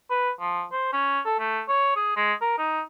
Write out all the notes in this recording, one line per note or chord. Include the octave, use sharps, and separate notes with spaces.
B4
F3
C5
C#4
A4
A3
C#5
G#4
G#3
A#4
D#4